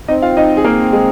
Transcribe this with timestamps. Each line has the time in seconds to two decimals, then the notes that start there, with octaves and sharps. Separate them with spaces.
0.08 C4 D#4 D#5
0.22 F4 F5
0.37 D#4 D#5
0.57 G#4
0.64 A#3 A#4
0.93 G#3 G#4